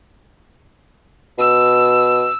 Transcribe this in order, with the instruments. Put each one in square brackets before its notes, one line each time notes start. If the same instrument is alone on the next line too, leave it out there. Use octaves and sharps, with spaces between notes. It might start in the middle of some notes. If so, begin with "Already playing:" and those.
[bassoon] B2 [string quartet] E6